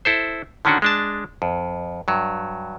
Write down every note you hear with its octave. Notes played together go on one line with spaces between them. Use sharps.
E4 A4 C5
D3 D#3 C#4 D4 F#4
G#3 D4 A5
F2
G2 F#3